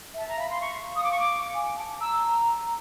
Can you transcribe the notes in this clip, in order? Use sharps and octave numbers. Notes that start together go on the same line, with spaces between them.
E5 A5
A#5
F5 B5
C6
C#6
D#6
D6
C#6
D6
G#5
A5
A#5 E6